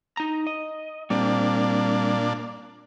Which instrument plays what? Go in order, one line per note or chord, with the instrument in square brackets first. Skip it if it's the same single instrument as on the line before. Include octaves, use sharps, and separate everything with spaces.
[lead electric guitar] D#4 A#5
D#5
[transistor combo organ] A#2 D4 [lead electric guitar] G3 C4